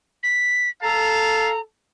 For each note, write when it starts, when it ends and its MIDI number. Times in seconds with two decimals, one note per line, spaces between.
0.23 0.69 95
0.83 1.58 69
0.83 1.50 77
0.83 1.50 81
0.83 1.60 82